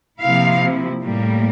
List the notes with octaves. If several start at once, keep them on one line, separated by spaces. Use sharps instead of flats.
C3 F3 A#3 E4 F5
A2 G3 A#3